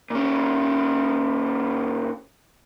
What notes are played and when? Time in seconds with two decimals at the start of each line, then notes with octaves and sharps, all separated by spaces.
0.10 A#2 C#4